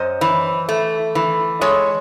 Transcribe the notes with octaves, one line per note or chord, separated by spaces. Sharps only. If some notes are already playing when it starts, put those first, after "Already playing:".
Already playing: F#2 C5 D#5
E3
A3
E3
G#3 A4 C#5